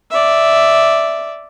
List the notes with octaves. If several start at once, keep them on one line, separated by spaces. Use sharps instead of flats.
D5 E5